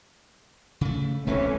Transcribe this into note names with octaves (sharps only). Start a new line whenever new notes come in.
C#3 A3
D1 B1 E3 A3 C4 C#4